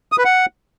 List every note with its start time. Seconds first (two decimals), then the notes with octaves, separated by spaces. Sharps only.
0.12 D#6
0.18 B4
0.25 F#5